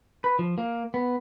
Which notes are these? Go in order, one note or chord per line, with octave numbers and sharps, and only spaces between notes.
B4
F3
A#3
B3